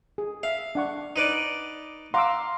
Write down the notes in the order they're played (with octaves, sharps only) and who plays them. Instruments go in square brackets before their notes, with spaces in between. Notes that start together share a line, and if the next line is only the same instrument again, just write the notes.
[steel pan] G#4
[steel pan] E5 [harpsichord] F5
[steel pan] D4 F#5 C#6
[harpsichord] D#4 B4 D5
[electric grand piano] F5 A#5 C6 [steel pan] F#5 D6 E6